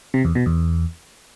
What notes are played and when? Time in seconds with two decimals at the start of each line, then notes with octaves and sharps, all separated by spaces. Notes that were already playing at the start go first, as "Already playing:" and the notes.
0.14 C3
0.25 E2
0.35 B2
0.46 E2